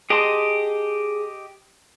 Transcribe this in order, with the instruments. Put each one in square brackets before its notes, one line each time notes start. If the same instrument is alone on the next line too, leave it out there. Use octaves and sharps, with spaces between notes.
[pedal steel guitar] G4 D#5 [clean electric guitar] G#4 A5 C6